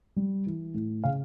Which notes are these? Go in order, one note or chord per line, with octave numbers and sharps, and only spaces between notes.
G3
E3
A2
C#3 F5